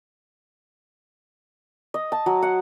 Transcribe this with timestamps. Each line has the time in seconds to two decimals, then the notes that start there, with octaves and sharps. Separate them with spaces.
1.94 D#5
2.12 A5
2.26 F#3
2.42 F#5